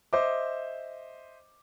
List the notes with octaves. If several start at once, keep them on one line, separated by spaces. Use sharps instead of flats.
C5 D#5 E5 D6